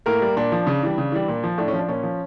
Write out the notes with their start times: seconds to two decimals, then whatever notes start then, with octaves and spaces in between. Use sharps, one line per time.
0.06 A2 A#3 A#4
0.22 G3
0.36 A#2 D4
0.52 F3
0.67 C#3
0.83 E3 G3
0.98 C#3
1.12 E3 G3
1.28 A#2
1.44 F3
1.58 A2 D4
1.68 C#4
1.73 F3
1.79 D4
1.89 A#2 C#4
2.03 F3